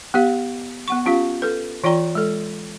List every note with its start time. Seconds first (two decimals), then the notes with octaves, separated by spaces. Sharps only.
0.14 B3 G4 F5
0.88 B3 F#5 C#6
1.06 C#4 F4 G4 F5
1.42 A4 B4
1.84 E3 F4 D5 G5 A#5
2.15 G#3 A4